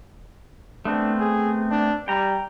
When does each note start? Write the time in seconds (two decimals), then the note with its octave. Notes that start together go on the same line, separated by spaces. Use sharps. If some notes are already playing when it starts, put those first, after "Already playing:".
0.85 A3 B3 C4 D4
1.20 G#4
1.71 D4
2.08 G3 G5 A#5